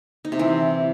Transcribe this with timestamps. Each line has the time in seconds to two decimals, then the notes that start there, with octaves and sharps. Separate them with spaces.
0.25 D#4
0.32 C3
0.39 E3